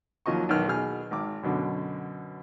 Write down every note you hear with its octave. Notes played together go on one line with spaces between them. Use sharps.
D#2 F3 F#3 D#5 C#6
B1 E2 D#3 F6
B2 G#4 F6
G#1 D6
F#2 B2 D3